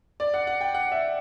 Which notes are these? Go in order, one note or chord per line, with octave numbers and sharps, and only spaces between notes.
D5
F#5
F#5
G5
F#5
E5